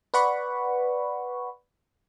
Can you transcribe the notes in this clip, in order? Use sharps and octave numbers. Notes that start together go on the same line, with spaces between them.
B4 D5 F#5 B5 C#6